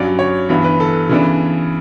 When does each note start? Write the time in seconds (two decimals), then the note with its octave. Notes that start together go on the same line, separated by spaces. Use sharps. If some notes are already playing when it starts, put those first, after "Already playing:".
Already playing: G2 F#3 C#4 D5
0.19 C#5
0.49 G2 E3 B3 D4
0.64 B4
0.80 A4
1.09 C#3 E3 B3 D4